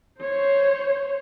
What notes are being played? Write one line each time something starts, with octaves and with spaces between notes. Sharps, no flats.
C5 C#5